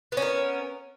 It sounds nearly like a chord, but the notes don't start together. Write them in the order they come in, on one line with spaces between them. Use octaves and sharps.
B3 C#4 A#4